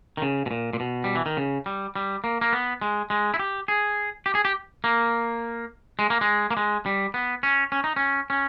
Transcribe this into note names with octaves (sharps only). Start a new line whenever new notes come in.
D#3
C#3
B2
A#2
A#2
B2
G3
E3
D#3
C#3
G3
G3
A#3
A#3
B3
G#3
G#3
E4
G4
G#4
G4
G#4
G4
A#3
G#3
A#3
G#3
A#3
G#3
G3
B3
C#4
C#4
D#4
C#4
C#4